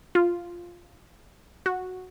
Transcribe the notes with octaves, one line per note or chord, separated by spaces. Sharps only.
F4
F#4